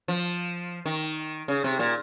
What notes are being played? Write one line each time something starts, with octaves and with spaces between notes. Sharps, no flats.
F3
D#3
C#3
C3
A#2